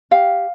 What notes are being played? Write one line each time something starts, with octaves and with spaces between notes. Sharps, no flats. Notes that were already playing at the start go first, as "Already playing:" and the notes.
G4 F5